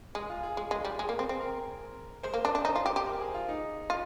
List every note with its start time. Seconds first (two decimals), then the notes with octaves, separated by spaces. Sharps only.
0.15 G#3 G#4
0.30 F4
0.43 G#4
0.57 G#3
0.71 G#3
0.85 G3
0.99 G#3
1.09 A#3
1.19 C4
1.29 C4
1.40 A#4
2.23 G#3 C5
2.34 A#3
2.45 D4
2.55 D4
2.65 D#4
2.75 F4
2.86 G4
2.96 G4
3.07 A#4
3.20 G#4
3.34 F4
3.48 D#4
3.90 F4